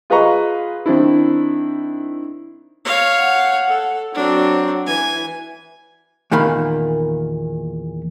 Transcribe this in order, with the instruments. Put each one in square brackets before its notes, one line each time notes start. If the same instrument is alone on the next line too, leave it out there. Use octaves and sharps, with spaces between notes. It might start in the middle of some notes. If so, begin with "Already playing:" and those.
[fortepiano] F4 G#4 B4 D#5 A#5 C#6
D#3 C4 D4 E4
[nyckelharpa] C#5 F5
[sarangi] F#5
[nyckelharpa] A4
[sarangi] F#3 [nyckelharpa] C4 D4
[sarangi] E3 [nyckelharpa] G#5
[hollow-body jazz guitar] E2 A#2 D#3 A#3 B5